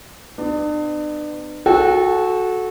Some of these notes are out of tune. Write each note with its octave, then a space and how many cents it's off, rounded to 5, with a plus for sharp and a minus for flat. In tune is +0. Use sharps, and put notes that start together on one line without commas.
B3 +30 D4 +40
F#4 -10 A4 -20 G5 +30